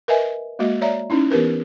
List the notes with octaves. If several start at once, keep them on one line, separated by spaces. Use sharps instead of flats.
A#4 B4 D#5 E5 G#5
G#3 A#3 F#4 D#5
C#5 D5 E5 A#5
C#4 D#4 E4
E3 B3 G4 A#4 B4